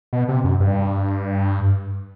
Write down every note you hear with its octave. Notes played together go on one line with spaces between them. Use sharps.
B2
C3
F#2
G2